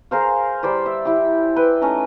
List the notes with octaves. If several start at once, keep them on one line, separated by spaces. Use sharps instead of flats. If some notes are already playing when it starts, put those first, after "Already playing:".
G#4 A#4 C5 F5
G3 C5 D5 B5
E5
E4 G4
B4 G5
A3 C#4 D#4